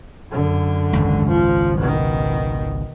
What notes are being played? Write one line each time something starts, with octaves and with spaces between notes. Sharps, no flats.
F#2 D3
G#1 C#2
F3
B2 D#3